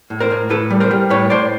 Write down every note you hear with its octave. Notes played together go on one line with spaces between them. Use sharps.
A2
A#4 C5
A2
A2 A4 B4
G3
A#4 C5
G3
A2 B4 C#5
A2 C5 D5